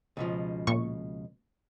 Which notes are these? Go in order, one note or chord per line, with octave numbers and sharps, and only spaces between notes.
C#2 B2 F3
A#2 C#6